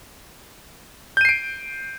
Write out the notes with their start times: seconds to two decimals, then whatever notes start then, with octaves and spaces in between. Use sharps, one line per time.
1.17 G6
1.21 D#7
1.25 C7
1.29 D7